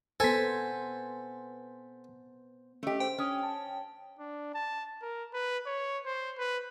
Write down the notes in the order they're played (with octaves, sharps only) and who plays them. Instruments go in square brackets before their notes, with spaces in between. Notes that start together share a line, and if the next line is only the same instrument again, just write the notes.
[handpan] B3 C5 [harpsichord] A4 [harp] G#5 B6
[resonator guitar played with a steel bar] A3 G4 [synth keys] C#4 D#5
[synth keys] C5 [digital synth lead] G5
[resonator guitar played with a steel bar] C#4 [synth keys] D#6 F6
[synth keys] A5
[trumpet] D4
A5
A#4
B4
C#5
C5
B4